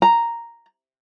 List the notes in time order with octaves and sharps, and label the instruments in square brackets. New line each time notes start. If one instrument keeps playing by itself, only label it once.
[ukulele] A#5